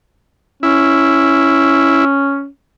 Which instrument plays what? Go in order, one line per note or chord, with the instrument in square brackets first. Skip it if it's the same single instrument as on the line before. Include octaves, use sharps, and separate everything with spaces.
[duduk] C#4 [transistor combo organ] E4